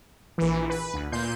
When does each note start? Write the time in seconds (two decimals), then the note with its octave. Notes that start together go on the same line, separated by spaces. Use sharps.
0.38 A#1 E3
0.70 B4
0.94 D2
1.12 A#2 C6 G6